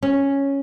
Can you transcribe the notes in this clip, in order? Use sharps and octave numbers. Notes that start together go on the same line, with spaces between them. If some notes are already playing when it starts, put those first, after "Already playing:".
C#4